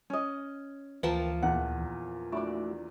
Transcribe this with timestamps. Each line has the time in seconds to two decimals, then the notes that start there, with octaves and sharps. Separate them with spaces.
0.10 C#4 D#5
1.03 D2 E3 F3 A#3 A#4 B4 G5 A5
1.42 E2 A#2 F#5
2.33 A3 D4 E4 F#4 D5